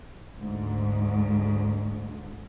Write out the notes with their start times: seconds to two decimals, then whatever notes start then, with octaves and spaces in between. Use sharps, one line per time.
0.39 D2 G#2